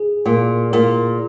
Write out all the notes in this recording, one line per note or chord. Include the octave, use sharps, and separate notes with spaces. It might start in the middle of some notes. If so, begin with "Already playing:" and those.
Already playing: G#4
A#2
A#2 A#4